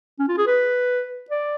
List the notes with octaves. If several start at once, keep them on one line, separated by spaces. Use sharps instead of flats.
C#4
F4
G#4
B4
D5